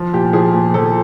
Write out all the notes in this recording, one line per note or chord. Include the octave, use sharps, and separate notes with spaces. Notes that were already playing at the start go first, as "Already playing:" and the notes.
Already playing: F3
A#2 G4
F3 G#4
A#2
F3 A4